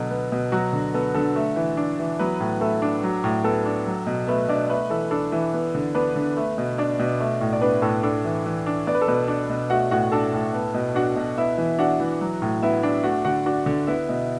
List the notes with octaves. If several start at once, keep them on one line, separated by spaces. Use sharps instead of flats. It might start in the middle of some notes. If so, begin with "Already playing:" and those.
Already playing: B2 D3 F#3 A4
B3
B2
F#3 F#4
D3
B3 A4
D3 A4
A3
E3
D4
E3
F#3 B3 B4
A2
A3 A4
D4
F#3
A2
B3 A4
D4
F#3
B2
A3 B3 B4
B2 D4 D5
A3 B3 B4
E3 A4
D4 A4
E3
B3
D3
B3 D4 B4
D3
A3
B2
D4 D5
B2
A3
A2
D5
B3 D4 B4
A2 A4
D4 A4
E3
E3
D4
B3 D5
B4
A4
B2 B3 B4
D4
B2
A3 F#4 F#5
A2 F#4 F#5
D4 A4 A5
A2
B3
B2
D4 F#4 F#5
B2
B3 E4 E5
E3
D4 F#4 F#5
E3
F#3
A2
B3 E4 E5
D4
A3 F#4 F#5
D3 F#4 F#5
D4 F#4 F#5
D3
B3 E4 E5
B2